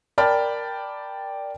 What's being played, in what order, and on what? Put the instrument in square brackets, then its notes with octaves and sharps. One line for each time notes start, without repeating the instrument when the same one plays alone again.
[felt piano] A#4 D5 G5 A5 B5 F6